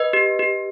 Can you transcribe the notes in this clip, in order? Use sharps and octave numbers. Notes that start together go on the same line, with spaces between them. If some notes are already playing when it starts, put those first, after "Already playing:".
Already playing: B4 D#5
G4
G4